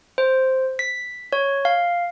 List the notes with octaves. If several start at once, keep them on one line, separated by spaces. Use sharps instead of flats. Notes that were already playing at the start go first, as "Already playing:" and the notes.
C5
B6
C#5
F5